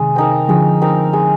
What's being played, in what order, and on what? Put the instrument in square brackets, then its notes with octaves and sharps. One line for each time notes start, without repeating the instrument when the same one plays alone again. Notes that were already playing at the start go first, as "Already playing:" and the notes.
Already playing: [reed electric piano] C3 D#3 [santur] G#3
[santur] C4 D#4 A#4
[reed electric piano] D3 F3 [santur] G#3
[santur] C4 D#4 A#4
G#3